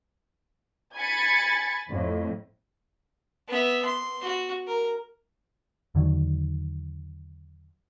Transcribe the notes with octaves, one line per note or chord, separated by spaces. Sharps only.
G#5 B5 G#6 A6 C#7
F2 A2
B3 E5
C6
F#4
A#4
E2 D3 D#3 F#3